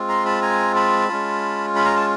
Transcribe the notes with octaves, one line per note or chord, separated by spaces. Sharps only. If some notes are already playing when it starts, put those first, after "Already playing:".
Already playing: G#3 C4 F4
A#5 C6
A5 B5
G#5 A#5
A5 B5
G#3 C#4 F4
B5
A#5
A5